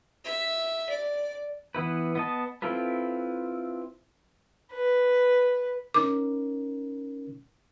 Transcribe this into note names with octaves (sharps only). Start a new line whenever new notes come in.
E5
D5
E3 B3 E4 B4
B3 D#5 A5
C4 E4 F4 A4 B4
B4
C#4 D#4 A#4 D6